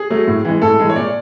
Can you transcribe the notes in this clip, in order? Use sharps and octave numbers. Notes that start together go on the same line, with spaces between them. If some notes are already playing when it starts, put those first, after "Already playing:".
Already playing: G#4
F#3 A3
A2
E3 G#3
A2 A4
E3 G#3
C#5
A#2 D5